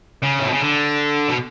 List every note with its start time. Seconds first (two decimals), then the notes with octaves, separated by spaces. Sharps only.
0.22 C#3
0.39 A2
0.46 B2
0.53 C#3
0.61 D3
1.29 B2